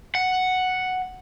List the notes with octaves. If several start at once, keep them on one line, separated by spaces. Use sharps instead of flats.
F#5